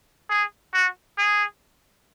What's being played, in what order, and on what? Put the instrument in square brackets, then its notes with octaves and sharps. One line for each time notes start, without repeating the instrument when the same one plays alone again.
[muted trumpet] G#4
F#4
G#4